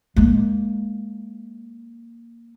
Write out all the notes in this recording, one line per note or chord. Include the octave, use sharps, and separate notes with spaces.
G#3 A#3